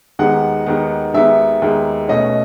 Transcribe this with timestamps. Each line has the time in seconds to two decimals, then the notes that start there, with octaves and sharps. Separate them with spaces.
0.19 D#2 D#3 G#3 B3 F#5
0.66 D#2 D#3 G#3 B3
1.14 D#2 D#3 G#3 B3 E5
1.62 D#2 D#3 G#3 B3
2.08 B2 A3 C#4 D#5